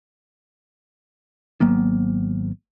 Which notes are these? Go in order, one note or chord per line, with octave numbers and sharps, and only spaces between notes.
G#1 F#3 A#3 B3